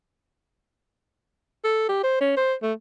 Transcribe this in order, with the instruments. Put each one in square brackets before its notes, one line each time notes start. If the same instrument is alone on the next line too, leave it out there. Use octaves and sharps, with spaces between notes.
[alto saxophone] A4
G4
C5
C#4
C5
A3